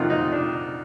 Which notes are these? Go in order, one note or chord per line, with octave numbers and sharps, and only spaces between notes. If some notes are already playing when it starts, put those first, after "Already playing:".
Already playing: F2 C3 D#3 F#3 F4
D#4
D4